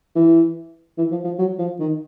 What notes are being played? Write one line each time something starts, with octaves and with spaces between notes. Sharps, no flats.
E3
E3
F3
F3
F#3
F3
D#3